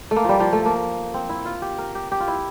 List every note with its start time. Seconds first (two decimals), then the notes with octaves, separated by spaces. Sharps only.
0.11 A3
0.16 A#3
0.24 F3 G3
0.40 F3
0.53 A3
0.66 A#3
1.14 C4
1.29 E4
1.45 F4
1.62 G4
1.78 A#4
1.95 G4
2.12 G4
2.20 F4
2.28 E4